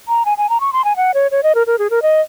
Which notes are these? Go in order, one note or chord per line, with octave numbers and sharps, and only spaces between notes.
A#5
G#5
G#5
A#5
C#6
C6
G#5
F#5
C#5
C#5
D#5
A#4
A#4
G#4
A#4
D#5